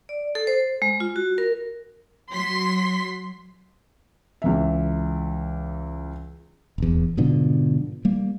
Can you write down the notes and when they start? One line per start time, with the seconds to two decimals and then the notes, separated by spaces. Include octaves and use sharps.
0.09 D5
0.35 A4
0.47 C5
0.82 G#3
1.00 F4
1.16 F#4
1.38 A#4
2.33 F#3 C6 B6
4.42 C#2 E3 E5
6.78 D#1 E2
7.17 G#2 B2 D3 F3
8.05 G3 A#3